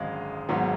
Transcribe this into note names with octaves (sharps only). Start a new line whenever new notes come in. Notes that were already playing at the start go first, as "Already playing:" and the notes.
Already playing: G#1 F#2 D3 G#3 D#5 F5
G#1 G#2 F#3 B3